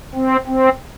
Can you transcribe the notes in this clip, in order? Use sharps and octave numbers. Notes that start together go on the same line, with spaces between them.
C4
C4